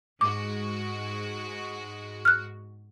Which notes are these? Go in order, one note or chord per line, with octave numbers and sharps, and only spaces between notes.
G#2 G#3 F#4 D6
F6 F#6